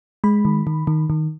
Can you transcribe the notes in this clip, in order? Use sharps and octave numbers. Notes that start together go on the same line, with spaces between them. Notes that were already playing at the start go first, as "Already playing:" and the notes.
G#3 B5
D#3
D#3
D#3
D#3